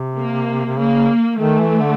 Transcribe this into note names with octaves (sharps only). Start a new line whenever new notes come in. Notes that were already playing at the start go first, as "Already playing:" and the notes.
Already playing: C3
A#3
C3
C#3 A#3
D#3 A3
E3
D3